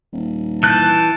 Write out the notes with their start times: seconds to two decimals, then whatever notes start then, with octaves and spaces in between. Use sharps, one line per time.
0.13 D#1
0.63 E3 A5 F#6 G6